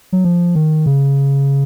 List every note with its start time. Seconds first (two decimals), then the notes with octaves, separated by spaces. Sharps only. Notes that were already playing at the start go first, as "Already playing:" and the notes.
0.12 F#3
0.24 F3
0.55 D#3
0.86 C#3